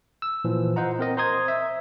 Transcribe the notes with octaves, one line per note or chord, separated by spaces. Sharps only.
E6
A#2 E3 F3
F4 C5 D#5 F#5 A#5
C4 A#4 D#5
C5 A#5 C6 D#6 G#6
E5